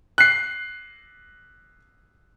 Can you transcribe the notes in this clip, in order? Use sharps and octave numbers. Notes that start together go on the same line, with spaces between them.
F#6 C7